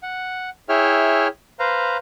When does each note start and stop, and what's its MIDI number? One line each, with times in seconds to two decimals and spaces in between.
0.03 0.50 78
0.69 1.28 64
0.69 1.28 68
0.69 1.28 73
0.69 1.28 76
0.69 1.28 79
0.69 1.28 89
1.59 1.97 71
1.59 1.97 72
1.59 1.97 77
1.59 1.97 82